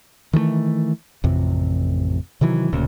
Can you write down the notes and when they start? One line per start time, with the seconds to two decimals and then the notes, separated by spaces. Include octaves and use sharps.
0.33 D#3 E3 G3 A3
1.24 A1 F2 C3
2.41 C3 D#3 E3 F#3
2.72 D1 D2 A#2 C#3